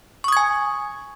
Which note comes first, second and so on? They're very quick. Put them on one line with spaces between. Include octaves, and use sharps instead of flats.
C#6 D#6 G#6 G#5